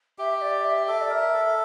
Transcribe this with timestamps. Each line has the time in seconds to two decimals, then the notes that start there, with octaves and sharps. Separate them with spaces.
0.18 G4 E5
0.38 E5
0.41 D5
0.64 E5
0.87 A4 E5
1.02 D5
1.09 A#4
1.15 E5
1.33 A4